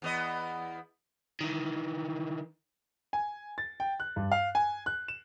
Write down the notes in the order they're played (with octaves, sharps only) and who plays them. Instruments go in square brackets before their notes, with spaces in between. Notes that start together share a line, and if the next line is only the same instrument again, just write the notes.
[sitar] E2 B3 D#5
[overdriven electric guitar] D#3 E3
[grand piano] G#5
A6
G5
F#6
G2
F5
G#5
F#6
E7